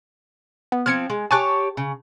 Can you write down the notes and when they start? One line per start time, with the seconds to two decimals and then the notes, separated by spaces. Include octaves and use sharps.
0.72 B3
0.86 F3 C4 F6 G#6 C#7
1.10 G#3
1.31 G4 C#5 G#5 A5 C#6 F#6
1.77 C#3